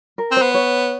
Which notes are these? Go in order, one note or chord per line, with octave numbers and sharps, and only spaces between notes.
A#4
C4
C5
B3
C#5